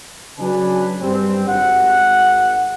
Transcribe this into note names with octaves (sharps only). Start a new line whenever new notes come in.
C#3 F#3 D4 B4 G#5
G2 G3 C4
G#1 F#5